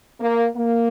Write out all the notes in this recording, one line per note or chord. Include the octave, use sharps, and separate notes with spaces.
A#3
A#3